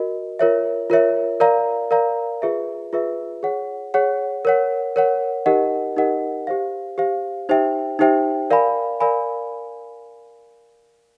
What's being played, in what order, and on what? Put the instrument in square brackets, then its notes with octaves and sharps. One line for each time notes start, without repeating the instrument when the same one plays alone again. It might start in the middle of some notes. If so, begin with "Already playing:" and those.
Already playing: [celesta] F#4 A#4 D#5
F4 A#4 C#5 E5
F4 A#4 C#5 E5
A#4 D5 F5 A#5
A#4 D5 F5 A#5
F4 G#4 B4 E5
F4 G#4 B4 E5
G#4 C#5 F#5
G#4 C#5 F#5
A#4 C#5 F#5
A#4 C#5 F#5
D#4 G4 A#4 D#5 F#5
D#4 G4 A#4 D#5 F#5
G4 C5 F5
G4 C5 F5
D#4 G4 C5 E5 G5
D#4 G4 C5 E5 G5
A#4 D5 F5 G#5 B5
A#4 D5 F5 G#5 B5